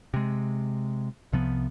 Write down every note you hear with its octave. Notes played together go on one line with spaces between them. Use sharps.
C3 G#3
C2 C3 F3 B3